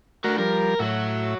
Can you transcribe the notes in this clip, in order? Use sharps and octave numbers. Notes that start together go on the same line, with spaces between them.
A3 D4 F#4 A#4
F3 G3 A#4
A2 F#3 F#4 E5